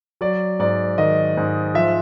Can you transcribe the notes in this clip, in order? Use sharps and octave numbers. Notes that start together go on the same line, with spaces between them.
F#3 D5
G#2 D5
D#3 D#5
G#2
F3 E5